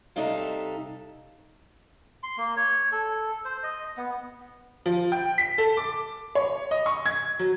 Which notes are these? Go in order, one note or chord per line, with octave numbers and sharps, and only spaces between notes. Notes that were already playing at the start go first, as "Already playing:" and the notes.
C3 G3 D#4 A4 E5 F5
C6
A#3
C#5
A4
C5
D#5
B3
F3
G5
B6
A4
D6
C#5
D#5
C#6
G#6
F#3